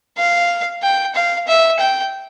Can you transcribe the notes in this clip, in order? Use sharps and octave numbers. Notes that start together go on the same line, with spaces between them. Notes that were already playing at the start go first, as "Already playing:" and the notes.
F5
G5
F5
E5
G5